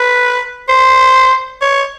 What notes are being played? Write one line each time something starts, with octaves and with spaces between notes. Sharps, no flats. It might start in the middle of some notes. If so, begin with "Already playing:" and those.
Already playing: B4
C5
C#5